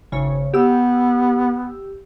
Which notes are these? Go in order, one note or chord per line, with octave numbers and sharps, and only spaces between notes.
G#1 C#3 C#5
B3 G4 E6